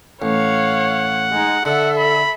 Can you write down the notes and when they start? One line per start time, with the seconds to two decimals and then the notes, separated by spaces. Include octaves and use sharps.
0.22 A1 C#5 F5 F#5
1.32 G#3 D#4
1.65 D3 A4 E5 F#5
1.97 B5